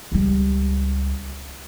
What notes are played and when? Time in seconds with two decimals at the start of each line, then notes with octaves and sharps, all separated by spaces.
0.12 C#2 G3